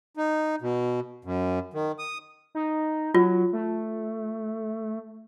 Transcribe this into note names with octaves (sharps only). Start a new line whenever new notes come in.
D#4
B2
F#2
D#3
D#6
D#4
F#3 F4
A3